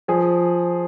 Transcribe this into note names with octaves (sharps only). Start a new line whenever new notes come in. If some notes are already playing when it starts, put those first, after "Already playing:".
F3 G#4